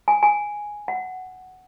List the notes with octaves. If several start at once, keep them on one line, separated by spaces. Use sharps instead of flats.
G#5
G#5
F#5